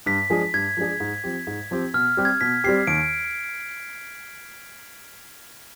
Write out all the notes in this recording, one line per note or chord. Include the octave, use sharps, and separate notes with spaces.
G2 B6
F3 G#3 D4 G#4
G2 G#6
F3 G#3 D4 G#4
G#2
F3 C4 G4
G#2
F3 C4 G4
B2 F6
G3 C4 G4
G#6
B2 B6
G3 C4 G4 C7
D#2 D7